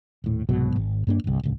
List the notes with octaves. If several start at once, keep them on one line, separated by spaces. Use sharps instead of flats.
D#1 A2
C2 G#2 B2 F#3
G#1
G2 A#3 D4
G1 C2
D1 C#2